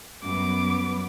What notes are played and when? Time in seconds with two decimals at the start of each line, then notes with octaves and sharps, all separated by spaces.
0.23 F#2 G3 B3 D6